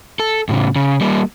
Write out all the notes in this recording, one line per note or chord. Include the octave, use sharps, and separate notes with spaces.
A4
A2 C#3
C#3
G3 A#3